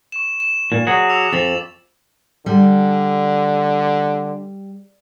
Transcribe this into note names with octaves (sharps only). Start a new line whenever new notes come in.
C#6 E7
E7
A#2
F#3 F#4 G#4
D6 E6 F7
F2 A6 F7 F#7
D3 G3